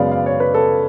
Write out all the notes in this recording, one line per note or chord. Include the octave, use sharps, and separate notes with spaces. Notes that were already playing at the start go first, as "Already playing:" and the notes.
Already playing: F#2 C#3 G#3 B3 D5 F5
F5
C#5
B4
A4